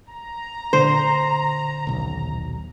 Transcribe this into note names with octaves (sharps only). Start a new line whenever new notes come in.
A#5
A#2 D3 C5
D#1 B1